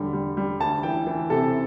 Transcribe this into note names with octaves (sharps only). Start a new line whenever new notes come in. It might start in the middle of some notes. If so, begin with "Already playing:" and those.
Already playing: E1 D3 G3
G3
G3
D2 A5
E3 G5
E3
C3 A4